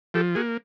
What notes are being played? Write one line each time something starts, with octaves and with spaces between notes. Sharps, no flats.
F3 G4 A4
A#3 F#4 G#4